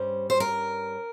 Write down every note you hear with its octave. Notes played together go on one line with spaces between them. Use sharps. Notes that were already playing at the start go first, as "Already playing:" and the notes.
Already playing: G2 G3 C#4 C5
C5
A#4